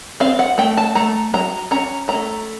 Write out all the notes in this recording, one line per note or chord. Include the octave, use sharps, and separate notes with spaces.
C4 F5
F#5
A3 G5
A5
A3 A#5
F#3 A#5
C#4 A#5
A3 A#5